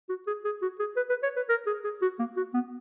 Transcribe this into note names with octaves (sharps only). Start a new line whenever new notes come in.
F#4
G#4
G#4
F#4
G#4
B4
B4
C#5
B4
A#4
G#4
G#4
F#4
A#3
F#4
B3